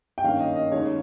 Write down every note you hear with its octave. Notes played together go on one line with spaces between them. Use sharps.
G5
G2 D#3 A#3 C#4 F5
D#5
D#5
D#2 D#3 G#3 C#4 C#5